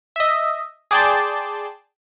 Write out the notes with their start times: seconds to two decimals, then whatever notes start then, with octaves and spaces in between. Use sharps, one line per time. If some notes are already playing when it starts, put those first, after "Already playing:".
0.16 D#5 E5
0.91 G#4 D5 G5 A5 C6